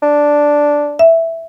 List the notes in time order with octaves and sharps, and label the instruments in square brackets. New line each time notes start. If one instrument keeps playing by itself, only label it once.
[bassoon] D4
[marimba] E5